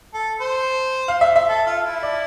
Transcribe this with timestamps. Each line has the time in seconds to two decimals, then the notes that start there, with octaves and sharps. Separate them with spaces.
0.14 A4
0.41 C5
1.08 F5
1.21 E5
1.36 E5
1.49 A4
1.67 F4
1.85 E4
2.03 D5